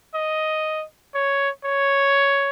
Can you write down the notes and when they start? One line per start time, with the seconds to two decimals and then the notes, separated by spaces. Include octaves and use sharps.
0.14 D#5
1.14 C#5
1.65 C#5